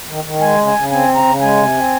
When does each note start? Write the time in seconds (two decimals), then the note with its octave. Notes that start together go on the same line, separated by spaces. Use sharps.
0.09 D#3
0.24 D#3
0.41 G#3 G#5
0.58 C#3
0.67 G#5
0.75 C#3
0.91 C4 G#5
1.08 C#3
1.16 A#5
1.24 C#3
1.41 G#3 G#5
1.57 C3
1.74 C4